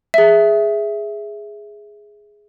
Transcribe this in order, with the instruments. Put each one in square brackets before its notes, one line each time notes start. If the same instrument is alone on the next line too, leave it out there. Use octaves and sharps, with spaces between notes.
[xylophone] G#4 E5